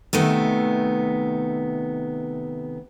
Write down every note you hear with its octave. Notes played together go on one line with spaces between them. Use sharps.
C3 D#3 A3 B3